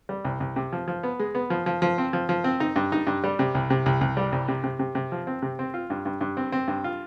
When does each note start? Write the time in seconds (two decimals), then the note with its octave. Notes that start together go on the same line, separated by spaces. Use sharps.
0.09 G3
0.24 C2
0.40 C2
0.56 C3
0.73 F3
0.88 F3
1.03 B3
1.19 G#3
1.35 B3
1.50 F3
1.66 F3
1.82 F3
1.98 C4
2.13 F3
2.29 F3
2.44 C4
2.60 D#4
2.76 G2
2.92 D#4
3.07 G2
3.24 G3
3.39 C3
3.55 C2
3.70 C3
3.86 C2
4.01 C2
4.17 G3
4.32 C2
4.48 C3
4.64 C3
4.79 C3
4.95 C3
5.12 F3
5.27 C4
5.42 C3
5.59 C4
5.74 F4
5.90 G2
6.05 G2
6.21 G2
6.37 C4
6.52 C4
6.68 G2
6.84 F4